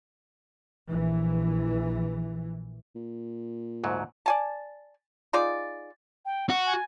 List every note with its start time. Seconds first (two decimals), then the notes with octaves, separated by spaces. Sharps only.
0.88 A#1 E3
2.95 A#2
3.84 D2 G#2 F#3
4.26 D5 G#5 A5
5.33 D#4 F4 G#4 D5
6.25 G5
6.49 F#4 C#7
6.66 G#5